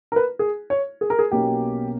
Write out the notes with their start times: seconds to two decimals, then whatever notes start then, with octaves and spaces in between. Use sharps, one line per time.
0.12 A#4
0.16 B4
0.39 G#4
0.70 C#5
1.01 G#4
1.10 A#4
1.19 G#4
1.32 B1 B2 A#3 C#4 G4